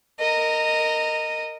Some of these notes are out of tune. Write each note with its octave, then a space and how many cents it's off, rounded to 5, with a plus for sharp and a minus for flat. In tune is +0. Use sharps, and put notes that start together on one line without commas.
A#4 -15 D#5 -5